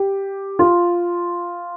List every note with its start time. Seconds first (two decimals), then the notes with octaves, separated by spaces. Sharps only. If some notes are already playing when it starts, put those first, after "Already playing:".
Already playing: G4
0.59 F4